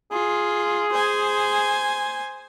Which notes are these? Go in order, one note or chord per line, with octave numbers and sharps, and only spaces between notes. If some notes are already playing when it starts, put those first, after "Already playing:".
F4 G#4
C5 G#5